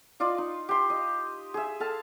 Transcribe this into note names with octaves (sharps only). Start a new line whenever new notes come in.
F4 D5 D#5 F5
D#4
G4 C6
D#5
G#4 E5
A4 F5 A5